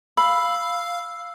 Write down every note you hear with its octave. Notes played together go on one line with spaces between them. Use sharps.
F5 B5 E6